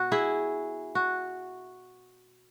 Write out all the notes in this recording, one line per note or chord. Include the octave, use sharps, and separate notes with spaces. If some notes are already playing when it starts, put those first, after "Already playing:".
Already playing: B2 F#4
E4 G#4
F#4